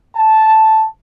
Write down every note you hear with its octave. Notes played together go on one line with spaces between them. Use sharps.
A5